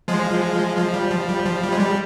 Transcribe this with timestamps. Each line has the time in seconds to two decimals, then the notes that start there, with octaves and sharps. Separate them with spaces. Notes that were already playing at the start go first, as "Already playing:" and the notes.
0.08 F3 G#3
0.77 F3
0.94 G3
1.11 F3
1.29 G3
1.45 F3
1.63 G3
1.72 G#3
1.80 G3